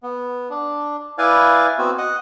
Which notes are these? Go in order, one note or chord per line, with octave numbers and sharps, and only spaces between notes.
B3
D4
E4 B4 D5 F5 G#5
B3 C4 F#4
D#5 F#5